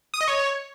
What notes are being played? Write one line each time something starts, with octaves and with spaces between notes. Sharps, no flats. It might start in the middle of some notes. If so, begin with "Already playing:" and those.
D#6
D#5
C#5